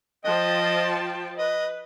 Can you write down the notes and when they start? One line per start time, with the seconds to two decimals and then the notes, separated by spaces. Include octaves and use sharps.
0.25 F3 D#5 G5 A5
1.38 B4 D#5